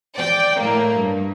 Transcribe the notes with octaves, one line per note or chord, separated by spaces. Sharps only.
D5 G5
A2 A#3
G2